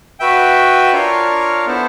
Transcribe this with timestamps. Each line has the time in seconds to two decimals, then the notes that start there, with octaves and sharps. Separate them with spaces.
0.20 F#4 B4 E5 G5
0.93 D4 F4 A#4 C#5 F5
1.66 B3 E4 A4 C5